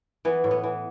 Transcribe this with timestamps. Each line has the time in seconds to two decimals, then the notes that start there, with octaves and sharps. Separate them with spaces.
0.25 E3 B3
0.44 A2
0.51 B3
0.64 E3